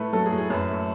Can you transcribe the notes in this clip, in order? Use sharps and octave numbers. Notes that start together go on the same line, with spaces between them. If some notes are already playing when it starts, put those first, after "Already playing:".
Already playing: A2 A3 B4
F#3 A4
G#4
A2
G#4
F#2 B4
A3